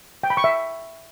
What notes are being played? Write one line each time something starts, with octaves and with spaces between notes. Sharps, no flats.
G5
B5
C#6
E5